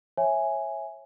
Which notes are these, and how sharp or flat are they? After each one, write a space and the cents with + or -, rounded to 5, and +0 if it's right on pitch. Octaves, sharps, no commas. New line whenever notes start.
C#5 -25 E5 +0 G#5 +0